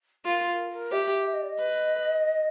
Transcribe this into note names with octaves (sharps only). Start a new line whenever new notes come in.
F4 A#4
A#4
A#4
G4 E5
E5
D#5
D5
D#5
B4